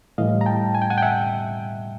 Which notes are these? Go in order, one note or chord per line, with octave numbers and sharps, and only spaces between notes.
A2 E3 G3 D#5 F5
A#5
G5 A5
G#5
G5
F#5 G#5
G5
E5 F#5